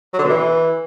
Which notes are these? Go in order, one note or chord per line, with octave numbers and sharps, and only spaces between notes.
F#3
D3
B2
E3